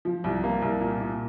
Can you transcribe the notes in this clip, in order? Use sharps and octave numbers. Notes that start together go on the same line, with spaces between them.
F3
C2
A#3
C2
A#2
A#2